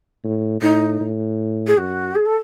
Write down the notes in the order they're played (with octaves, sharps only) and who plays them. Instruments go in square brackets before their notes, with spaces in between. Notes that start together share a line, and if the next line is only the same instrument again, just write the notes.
[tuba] A2
[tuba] A2 [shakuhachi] D#4
[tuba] A2
[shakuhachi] G#4
[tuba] F#2 [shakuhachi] F#4
[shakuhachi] G#4
A4